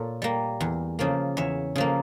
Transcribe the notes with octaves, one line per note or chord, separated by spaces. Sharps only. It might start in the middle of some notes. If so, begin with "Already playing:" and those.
Already playing: A#2 A4 C#5
G3 A#3
E2
C#3 F3 A#3
E2 C#5 E5
C#3 F3 A#3